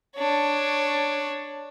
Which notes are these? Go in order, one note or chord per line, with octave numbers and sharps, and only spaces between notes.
D4 C#5